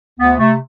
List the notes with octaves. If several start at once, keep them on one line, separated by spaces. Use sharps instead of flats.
D2 B3
C3 A3